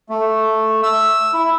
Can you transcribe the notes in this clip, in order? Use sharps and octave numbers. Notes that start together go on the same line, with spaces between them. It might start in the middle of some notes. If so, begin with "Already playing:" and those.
A3
E6
E4